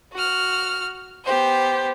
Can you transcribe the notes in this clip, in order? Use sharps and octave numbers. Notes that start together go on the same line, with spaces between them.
F#4 F6
B3 G4 C5